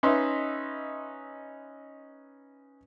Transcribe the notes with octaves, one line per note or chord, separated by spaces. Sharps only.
C#4 D#4 B4 D#5 E5 C6